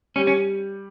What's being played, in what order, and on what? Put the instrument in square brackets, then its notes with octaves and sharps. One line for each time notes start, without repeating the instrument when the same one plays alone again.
[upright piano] G3 [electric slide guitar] C#4
[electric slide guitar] C#4